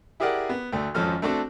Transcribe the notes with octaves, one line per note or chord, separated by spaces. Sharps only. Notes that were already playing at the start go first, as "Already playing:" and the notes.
E4 G4 G#4 A#4 D5 F#5
B3
D2 A3
G#1 F2 F3 C#4 A4 F6
A3 C4 D4 F#4 A4